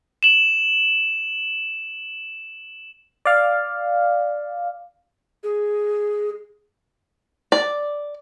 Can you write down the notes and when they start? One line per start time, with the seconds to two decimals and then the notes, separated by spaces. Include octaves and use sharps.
0.23 E7 F#7
3.25 D5 F5
5.44 G#4
7.52 D5